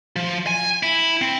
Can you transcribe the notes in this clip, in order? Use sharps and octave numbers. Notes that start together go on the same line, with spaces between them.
F3
G#5
E4
C4